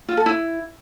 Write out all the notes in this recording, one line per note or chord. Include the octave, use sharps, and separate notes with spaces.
F4
A4
E4